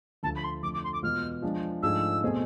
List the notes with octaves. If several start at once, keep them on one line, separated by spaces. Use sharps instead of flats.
D2 D3 F3 A3 A5
B5
C6
F2 D3 F3 A3 D6
D6
C6
D6
E2 B2 G#3 B3 F4 F6
F3 G#3 D4
G#2 F3 A3 D4 G#4 E6
B2 A3 C4 G#4